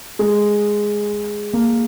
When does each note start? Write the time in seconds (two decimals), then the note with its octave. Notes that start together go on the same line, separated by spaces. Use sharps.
0.19 G#3
1.53 A#3